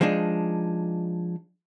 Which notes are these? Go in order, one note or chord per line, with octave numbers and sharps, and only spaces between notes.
F3 G#3 D4 D#4